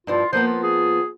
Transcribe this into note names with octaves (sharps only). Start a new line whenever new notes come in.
G2 F3 E4 F4
F3 A#3 B3 C5
F4
G#4